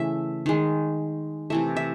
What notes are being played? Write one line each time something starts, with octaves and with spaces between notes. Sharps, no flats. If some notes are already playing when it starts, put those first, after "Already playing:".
Already playing: C#3 E3 A3 E5
D#3 G#3
C3 E3 A3 E5
E5